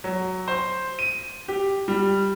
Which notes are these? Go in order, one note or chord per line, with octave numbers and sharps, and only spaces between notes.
F#3
C5
D#7
G4
G3